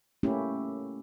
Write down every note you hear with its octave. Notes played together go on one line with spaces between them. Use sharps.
A3 A#3 C#4 E4 G4